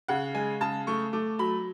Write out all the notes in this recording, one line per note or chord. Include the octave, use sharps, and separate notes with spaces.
C#3 F#5
G#3 G#5
C#3 A5
A3 C#6
A3 D6
F#3 B5